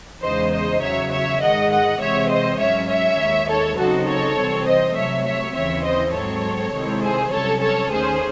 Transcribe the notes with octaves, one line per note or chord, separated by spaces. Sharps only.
E2 C#3 G#3 D#4 C5 D#5
C5 D#5
E2 C#3 F#3 C#5 E5
C#5 E5
G#2 D#3 G#3 D#5 F#5
D#5 F#5
C3 E3 G#3 C4 C#5 E5
C5 D#5
G#2 F#3 C#4 C#5 E5
C#5 E5
D#2 D#3 G#3
A4 C#5
C#3 F#3 C4 D#4 F#4 A4
A4 C#5
C2 C3 E3 C4
C5 D#5
C3 F#3 A3 C#5 E5
C#5 E5
D#2 C#3 E3 C4 E4 C#5 E5
C5 D#5
G#2 F#3 C4 A4 C#5
C3 D#3 G#3 C4 E4
G#4 C5
C2 C3 F#3 C#4 A4 C#5
A4 C#5
D#2 D#3 A3 C#4 G#4 C5